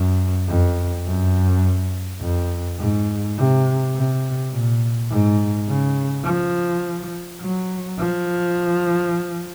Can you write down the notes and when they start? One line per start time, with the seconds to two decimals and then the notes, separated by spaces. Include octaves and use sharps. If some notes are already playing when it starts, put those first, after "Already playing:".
Already playing: F#2
0.49 F2
1.06 F#2
2.21 F2
2.80 G#2
3.38 C3
3.95 C3
4.52 A#2
5.11 G#2
5.68 C#3
6.25 F3
7.42 F#3
7.99 F3